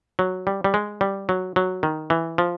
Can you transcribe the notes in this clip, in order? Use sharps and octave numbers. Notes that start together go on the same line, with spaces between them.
F#3
G3
G3
G#3
G3
F#3
F#3
D#3
E3
F3